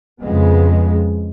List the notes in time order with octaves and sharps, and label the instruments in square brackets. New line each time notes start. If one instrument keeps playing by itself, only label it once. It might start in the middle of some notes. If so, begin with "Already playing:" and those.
[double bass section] F2 C#3 G#3 B3